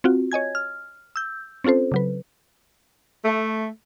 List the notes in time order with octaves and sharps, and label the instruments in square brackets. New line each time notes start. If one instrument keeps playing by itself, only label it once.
[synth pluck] C4 F4 F#4
C#5 D#5 G#5 G#6
F6
E6 G6
C4 C#4 F4 A4 C5
C#3 F#3 B4
[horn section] A3